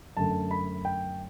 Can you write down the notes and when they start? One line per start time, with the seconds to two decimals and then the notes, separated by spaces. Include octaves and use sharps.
0.17 F#2 D3 A3 A5
0.51 B5
0.85 G5